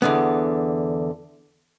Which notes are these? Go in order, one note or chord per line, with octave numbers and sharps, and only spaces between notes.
E2 D3 B3